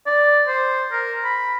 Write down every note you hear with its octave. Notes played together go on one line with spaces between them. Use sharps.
D5
C5
A#4
B5